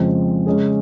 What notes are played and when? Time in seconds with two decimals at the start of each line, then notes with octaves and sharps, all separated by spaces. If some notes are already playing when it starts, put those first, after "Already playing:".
Already playing: F2 C#3 F3 G#3 C4
0.46 C#3 G#3 C#4 G#4